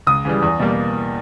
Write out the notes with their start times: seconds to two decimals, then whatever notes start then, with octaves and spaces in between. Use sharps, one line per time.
0.07 C#2 D#6
0.25 C#3 E3 G3
0.42 E2
0.59 B2 G3 A#3